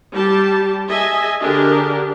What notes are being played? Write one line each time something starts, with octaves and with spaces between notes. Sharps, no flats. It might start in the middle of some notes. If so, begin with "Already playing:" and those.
G3 G4 A5
G#4 D#5 E5 G#5
D3 D4 G4 G#4 A#4